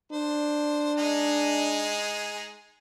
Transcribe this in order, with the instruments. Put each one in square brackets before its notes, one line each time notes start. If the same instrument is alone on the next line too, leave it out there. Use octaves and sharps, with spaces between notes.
[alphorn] D4 [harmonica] C5
[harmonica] G#3 D#4 G#4